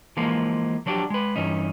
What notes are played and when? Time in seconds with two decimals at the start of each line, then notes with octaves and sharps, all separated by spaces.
0.17 E3 F3 G#3 A#3
0.86 F3 F#3 D4 G4
1.10 G#3 B4
1.36 G2 E3 C#4 D#4